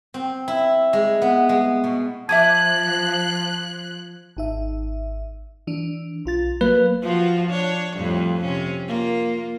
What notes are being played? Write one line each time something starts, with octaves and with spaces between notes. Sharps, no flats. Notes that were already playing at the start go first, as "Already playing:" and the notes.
C4
E4
G#3
B3
G#3
B2
F3 E5 A5 D6 D#6 F#6 G#6
G#1 D#4 E5
E3 D4
B1 F4 A6
F#3 A#3 B4
F3 F4 F#4
D4 C#5
F2 A2 G3
C3 C#4
A#3 F4